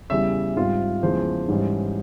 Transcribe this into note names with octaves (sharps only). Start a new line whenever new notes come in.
E2 C#3 G3 E5
G#2 G3 C4 F4
E2 C#3 F3 G#3 C5
G#2 E3 G3 C#4